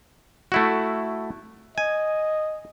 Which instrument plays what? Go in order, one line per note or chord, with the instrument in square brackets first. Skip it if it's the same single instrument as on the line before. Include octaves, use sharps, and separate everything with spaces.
[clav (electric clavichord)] A3 E4 F#4
[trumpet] D#5 [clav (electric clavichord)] G#5